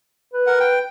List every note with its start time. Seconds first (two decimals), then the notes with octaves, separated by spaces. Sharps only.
0.33 B4
0.47 A#4 F#5
0.60 G5